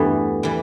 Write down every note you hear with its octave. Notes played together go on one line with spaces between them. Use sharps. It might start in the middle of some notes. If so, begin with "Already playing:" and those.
Already playing: E2 G2 E3 G3 A3 B3
E3 G3